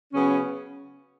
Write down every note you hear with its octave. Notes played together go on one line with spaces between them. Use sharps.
C#3 F#3 B3 C#4